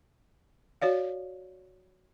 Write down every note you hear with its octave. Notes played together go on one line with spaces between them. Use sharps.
F#4 C#5 D5 F5